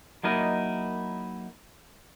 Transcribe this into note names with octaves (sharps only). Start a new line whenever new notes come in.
F#3 A#3 D#4 E4 A#4 D#5